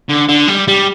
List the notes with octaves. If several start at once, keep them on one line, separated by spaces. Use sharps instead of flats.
D3
D3
G3
G3